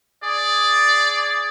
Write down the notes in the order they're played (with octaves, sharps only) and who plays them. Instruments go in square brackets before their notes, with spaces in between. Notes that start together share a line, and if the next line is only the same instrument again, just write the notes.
[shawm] G#4 [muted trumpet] D5